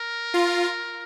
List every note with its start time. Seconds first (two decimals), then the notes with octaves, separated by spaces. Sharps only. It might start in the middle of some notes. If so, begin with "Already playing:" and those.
Already playing: A#4
0.34 F4